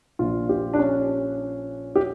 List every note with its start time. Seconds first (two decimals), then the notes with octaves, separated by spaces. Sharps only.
0.19 A#1 A#2 F3 F4
0.49 G4
0.74 D4
0.79 C#4
1.96 G4